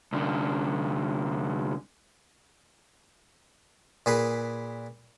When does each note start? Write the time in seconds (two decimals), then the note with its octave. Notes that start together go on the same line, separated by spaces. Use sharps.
0.13 C2 D3
4.06 A#2 G#4 B4